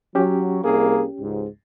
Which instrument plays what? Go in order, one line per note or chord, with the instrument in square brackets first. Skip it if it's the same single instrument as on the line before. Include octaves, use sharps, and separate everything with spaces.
[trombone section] F#3 [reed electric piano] C#4 G4
[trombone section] C2 A#3 G#4
C#2 G#2